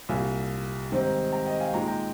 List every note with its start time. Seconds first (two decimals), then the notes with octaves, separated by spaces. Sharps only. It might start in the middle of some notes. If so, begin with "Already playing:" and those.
0.09 C2 A#2 G3 F5 G#5
0.91 G#2 D#3 G3 C4 D#4
1.32 G5 A#5
1.46 D#5 G5
1.60 F5 G#5
1.73 A#2 G#3 D#4 G5 A#5
1.87 G5 A#5